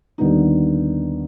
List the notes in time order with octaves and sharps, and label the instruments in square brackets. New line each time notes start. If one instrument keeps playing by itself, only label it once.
[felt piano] D#2 D3 G3 B3 D#4